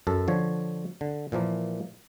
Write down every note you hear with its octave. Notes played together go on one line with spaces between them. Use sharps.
F#2 A4
D3 F3 C#5
D3
A#2 E3 F3 A#3